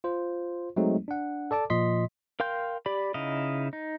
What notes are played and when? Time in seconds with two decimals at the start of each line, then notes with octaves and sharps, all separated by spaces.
0.04 F4 C5
0.76 F#3 G#3 A3 C4 D#4
1.08 D4 F#5
1.51 A4 D5 A5 D6
1.70 A#2 F3 D#5 C6 B6
2.40 A#4 F5 G5 C6 G6
2.86 G4 D5 B5
3.14 C#3 D#4 E4 D#5 F5
3.73 D#4